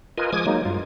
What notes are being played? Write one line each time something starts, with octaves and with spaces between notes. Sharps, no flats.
F4 A#4 B4 D#5 G#5
F3 G#3 G#5 D6 D#6 G#6
F#3 G#3 A#3 D#4
G2 F4